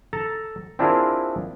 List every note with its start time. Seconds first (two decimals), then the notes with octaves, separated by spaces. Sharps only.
0.13 A4 A5 A#5
0.79 C4 D4 E4 F4 G#4 A#4